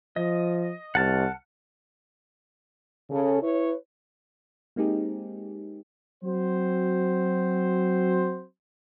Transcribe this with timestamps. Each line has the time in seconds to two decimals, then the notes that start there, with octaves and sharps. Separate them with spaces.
0.16 F3 D#5
0.95 C2 F#5 A5 F6
3.11 C#3 A4
3.42 E4 B4 C#5
4.76 G#3 A#3 C4 D#4 G4 G#4
6.24 F#3 C4 F#4 C5